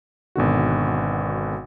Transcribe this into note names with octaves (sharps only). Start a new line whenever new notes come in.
G#1 B2 D3 F#4